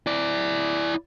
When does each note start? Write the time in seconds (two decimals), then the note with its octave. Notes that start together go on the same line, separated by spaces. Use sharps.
0.07 E4 D5